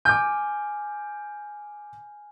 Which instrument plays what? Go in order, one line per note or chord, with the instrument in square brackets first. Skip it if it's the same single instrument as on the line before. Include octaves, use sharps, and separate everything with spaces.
[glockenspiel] G#5 F6 [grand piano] D6 G6